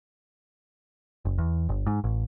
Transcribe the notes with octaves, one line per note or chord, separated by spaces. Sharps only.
F#1
E2
G1
G#2
A1